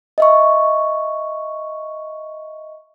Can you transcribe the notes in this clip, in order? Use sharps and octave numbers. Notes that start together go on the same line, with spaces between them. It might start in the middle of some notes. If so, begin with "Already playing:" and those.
D#5 E5 C#6